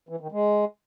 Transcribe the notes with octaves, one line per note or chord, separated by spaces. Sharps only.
E3
D#3
G#3